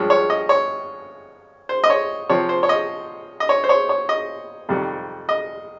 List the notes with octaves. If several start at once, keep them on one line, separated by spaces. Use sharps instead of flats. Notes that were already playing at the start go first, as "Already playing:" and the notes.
Already playing: G2 F3 G#3 C#5
C#5
D#5
C#5
C5
D#5
C#5
C3 F3 C4 C#5
C5
C#5
D#5
D#5
C#5
C5
C#5
C#5
D#5
F2 C3 D#3 G3
D#5